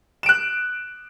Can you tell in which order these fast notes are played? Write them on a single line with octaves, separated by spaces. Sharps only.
E7 D7 F#6